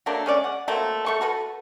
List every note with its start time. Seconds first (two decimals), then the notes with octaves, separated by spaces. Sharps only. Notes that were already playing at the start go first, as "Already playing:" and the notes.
0.06 F#3 A3 A#3 D4
0.26 G#3 C#4 D5
0.44 F#5
0.68 F#3 A3 A#3 C4
1.06 A3 A4 C#6
1.21 F#4 A4 B4